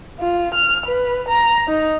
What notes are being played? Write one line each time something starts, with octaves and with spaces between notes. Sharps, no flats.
F4
F6
B4
A#5
D#4